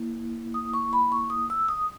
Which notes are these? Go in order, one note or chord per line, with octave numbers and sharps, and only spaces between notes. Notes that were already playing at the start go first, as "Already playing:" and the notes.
Already playing: A#3 E4
D#6
C#6
B5
C#6
D#6
E6
D#6